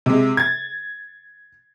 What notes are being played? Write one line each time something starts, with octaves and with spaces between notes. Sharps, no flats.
C3 G#3
G#6 A6